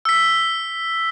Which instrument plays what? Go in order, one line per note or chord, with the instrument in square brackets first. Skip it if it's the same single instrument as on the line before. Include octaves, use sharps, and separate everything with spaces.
[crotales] E6 B6